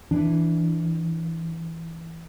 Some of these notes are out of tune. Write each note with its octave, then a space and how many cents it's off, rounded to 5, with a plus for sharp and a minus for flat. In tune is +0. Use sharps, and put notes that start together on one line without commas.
E3 +0 D4 +0